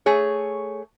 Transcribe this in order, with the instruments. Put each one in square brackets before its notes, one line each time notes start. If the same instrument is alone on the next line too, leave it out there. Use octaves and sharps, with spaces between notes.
[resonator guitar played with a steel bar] A3 G#4 C#5